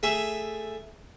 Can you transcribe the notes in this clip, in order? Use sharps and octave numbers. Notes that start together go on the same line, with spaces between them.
A3 G#4 E5